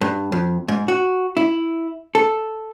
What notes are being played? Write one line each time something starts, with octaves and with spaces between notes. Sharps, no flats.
G2
F2
G#2
F#4
E4
A4